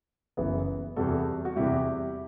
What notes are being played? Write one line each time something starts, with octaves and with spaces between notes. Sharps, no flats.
F#1 F#2 E3 B3
E2 C3 G3 F#4 A4
F#4
E2 C3 G3 E4 G4